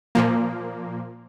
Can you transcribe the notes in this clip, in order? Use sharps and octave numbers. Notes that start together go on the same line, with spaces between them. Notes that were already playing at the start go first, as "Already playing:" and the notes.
A#2 F3 A#3